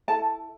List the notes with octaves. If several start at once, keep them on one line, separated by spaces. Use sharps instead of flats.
E4 A4 A5